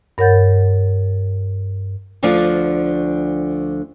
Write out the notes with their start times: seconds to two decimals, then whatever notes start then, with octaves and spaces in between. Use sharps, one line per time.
0.18 G2 A#4 C#5 F#5 G6 A6
2.23 D2 D3 F3 F4 D5